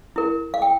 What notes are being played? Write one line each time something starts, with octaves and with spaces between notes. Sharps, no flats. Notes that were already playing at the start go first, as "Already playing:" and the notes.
E4 A#4
F5
G5